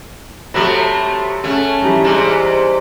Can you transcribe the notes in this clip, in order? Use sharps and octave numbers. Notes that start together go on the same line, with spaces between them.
C3 F#3 A3 B4 D#5
C#3 A3 C#4 F#5
E3 G3 D#4
G#2 C3